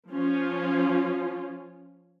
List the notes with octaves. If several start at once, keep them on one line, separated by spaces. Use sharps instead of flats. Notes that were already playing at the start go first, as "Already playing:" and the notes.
F3 C#4 F4